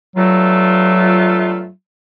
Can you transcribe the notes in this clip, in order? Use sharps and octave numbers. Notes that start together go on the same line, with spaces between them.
G2 F#3 A3 F4